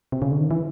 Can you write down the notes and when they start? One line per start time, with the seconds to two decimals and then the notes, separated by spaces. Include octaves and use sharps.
0.12 C3
0.22 C#3
0.31 D3
0.40 D#3
0.51 E3